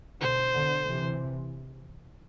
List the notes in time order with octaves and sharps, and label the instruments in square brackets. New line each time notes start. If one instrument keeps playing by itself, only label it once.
[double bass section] B2 D3 [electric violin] C5
[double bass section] B2 D3
C3 E3